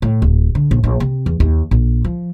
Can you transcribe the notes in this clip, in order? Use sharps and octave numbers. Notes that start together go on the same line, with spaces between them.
A2
D1
D3
A#1
A#1
C3
E2
D#2
A#1
F3